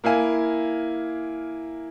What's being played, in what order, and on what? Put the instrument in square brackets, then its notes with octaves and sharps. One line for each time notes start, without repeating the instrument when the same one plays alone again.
[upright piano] A#3 E4 F5 G#5